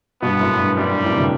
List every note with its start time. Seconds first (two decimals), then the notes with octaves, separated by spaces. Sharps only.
0.22 G2 B2 B3
0.40 F#2 A2
0.58 G2
0.77 F#2 G3
0.91 G2
1.04 F#2 A2
1.12 C3
1.18 B2 D3